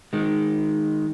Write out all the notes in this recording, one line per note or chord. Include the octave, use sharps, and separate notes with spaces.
D#3 G#3